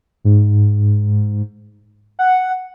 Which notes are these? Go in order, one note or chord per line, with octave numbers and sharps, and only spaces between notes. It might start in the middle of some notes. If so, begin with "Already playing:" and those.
G#2
F#5